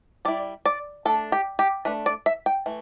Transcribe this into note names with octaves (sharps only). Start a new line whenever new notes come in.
G3 E4 D5
D5
A3 D4 A4
G4
G4
A3 D4 B4
D5
E5
G5
E3 A3